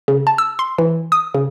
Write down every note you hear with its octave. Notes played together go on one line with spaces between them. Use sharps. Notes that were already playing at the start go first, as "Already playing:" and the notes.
C#3
A5
E6
C6
E3
D#6
C#3